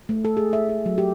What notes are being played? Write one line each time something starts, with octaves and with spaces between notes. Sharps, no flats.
A3
A4
G#4
E5
G#4
F#3
G4